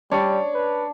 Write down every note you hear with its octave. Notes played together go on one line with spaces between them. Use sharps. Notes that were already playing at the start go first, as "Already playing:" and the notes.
G3 D4 C#5 D5 C#6
B4